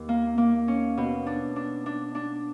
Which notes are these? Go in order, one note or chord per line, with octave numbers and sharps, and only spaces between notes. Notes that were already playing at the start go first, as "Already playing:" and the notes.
Already playing: D#2
A#3
A#3
C#4
B2
D4
D4
D4
D4